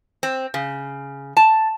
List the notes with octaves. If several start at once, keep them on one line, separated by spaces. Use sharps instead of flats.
C4
C#3
A5